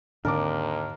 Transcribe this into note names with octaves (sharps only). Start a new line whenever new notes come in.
D#2 G#2 D3 C4 D4 A#4 A5 D6